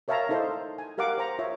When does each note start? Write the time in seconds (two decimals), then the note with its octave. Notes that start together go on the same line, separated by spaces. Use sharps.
0.08 A#4 C#5 E5 F5 A5 A#5
0.29 D#4 E4 A4 C5 F5 C6
0.78 G#5
0.98 G4 A#4 F5 F#5 D6
1.18 C5 A#5
1.39 F4 C#5 E5